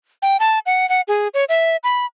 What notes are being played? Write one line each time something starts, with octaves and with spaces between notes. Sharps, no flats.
G5
A5
F#5
F#5
G#4
C#5
E5
B5